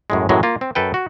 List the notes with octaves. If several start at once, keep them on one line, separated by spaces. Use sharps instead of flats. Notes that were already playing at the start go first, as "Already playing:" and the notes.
F#2 A2 G#3
F#2 A2 E3 F#3 G#3
A#3 F4
C4
F#2 A4 B4 G5
F#4